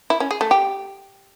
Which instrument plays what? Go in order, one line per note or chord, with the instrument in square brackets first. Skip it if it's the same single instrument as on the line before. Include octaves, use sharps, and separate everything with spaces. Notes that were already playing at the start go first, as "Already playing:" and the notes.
[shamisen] E4
C#4
G#4
A3
G4